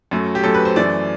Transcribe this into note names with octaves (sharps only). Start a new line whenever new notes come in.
F#2 F#3 A3
G4
F#2 F#3 A3 A4
B4
C5
F#2 E3 A3 D5